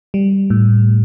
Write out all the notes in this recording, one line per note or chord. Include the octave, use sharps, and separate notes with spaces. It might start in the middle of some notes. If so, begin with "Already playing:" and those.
G3
A2